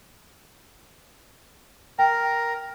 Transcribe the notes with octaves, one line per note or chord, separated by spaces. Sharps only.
A#4 G5 A#5